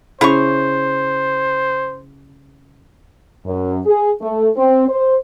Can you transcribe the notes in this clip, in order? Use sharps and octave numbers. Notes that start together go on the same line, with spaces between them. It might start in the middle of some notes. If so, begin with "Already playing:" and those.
C#3 E4 C5 F5 A#5 C#6
F#2
G#4
A3
C4
C5